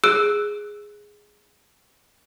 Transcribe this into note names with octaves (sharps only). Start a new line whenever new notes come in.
G#4 E6 F#6 D7